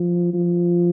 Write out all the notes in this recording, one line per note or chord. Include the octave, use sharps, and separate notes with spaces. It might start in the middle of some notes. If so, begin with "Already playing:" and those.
Already playing: F3
F3